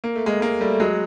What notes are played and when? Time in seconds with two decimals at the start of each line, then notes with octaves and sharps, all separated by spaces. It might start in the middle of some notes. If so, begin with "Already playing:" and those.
0.04 A#3
0.15 A3
0.26 G#3 A#3
0.41 G#3 A#3
0.61 G3 A3
0.74 A3
0.80 F#3 G#3